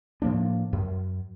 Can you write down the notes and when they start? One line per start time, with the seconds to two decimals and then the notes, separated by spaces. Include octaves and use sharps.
0.22 A2 F3 A#3 D4
0.73 F#2